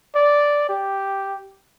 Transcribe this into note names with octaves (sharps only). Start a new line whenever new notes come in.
D5
G4